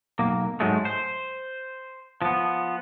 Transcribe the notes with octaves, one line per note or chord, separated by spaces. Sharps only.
B1 A#3
G#2 F#3 G#3 A3
C5
F3 B3